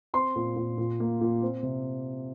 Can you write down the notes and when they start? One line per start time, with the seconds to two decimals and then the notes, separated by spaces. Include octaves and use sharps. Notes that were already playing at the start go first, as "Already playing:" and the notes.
0.14 C4 C6
0.36 A#2
0.56 A#2
0.78 A#2
1.00 A#3
1.21 A#2
1.42 C4
1.63 C3